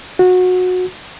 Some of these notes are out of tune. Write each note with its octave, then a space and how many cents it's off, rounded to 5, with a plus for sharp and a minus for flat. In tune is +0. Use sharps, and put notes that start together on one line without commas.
F#4 -20